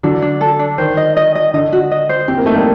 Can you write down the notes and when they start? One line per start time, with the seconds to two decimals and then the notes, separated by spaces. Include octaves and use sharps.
0.03 D3 F#3 D4
0.22 D4
0.41 A4
0.59 D4
0.78 D#3 C5
0.97 D#5
1.17 D#5
1.35 D#5
1.54 D3 D#5
1.72 F#4
1.91 D#5
2.09 C5
2.28 C4 G4
2.38 A#3
2.46 A3 D#4
2.55 G3 A#3